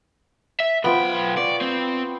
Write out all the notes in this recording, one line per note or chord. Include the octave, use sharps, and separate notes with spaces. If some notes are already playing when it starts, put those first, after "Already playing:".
E5
B1 B3 F4 C5 G5
D5 C#6
C4